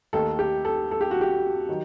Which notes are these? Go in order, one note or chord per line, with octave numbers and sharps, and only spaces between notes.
D#2 D#3 A3 A4
G4
A4
A4
G4
F#4
G4
D#3 F#3